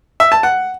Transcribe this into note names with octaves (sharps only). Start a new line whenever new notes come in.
E5
A5
F#5